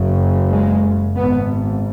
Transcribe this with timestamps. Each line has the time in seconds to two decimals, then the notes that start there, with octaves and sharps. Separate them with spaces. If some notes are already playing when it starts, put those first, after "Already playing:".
Already playing: F#1 F#2 C#3
0.51 G#3
1.17 G#1 G#2 B3